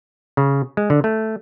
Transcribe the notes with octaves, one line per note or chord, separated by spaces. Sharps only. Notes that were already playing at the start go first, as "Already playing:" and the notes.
C#3
G#3
D3
A3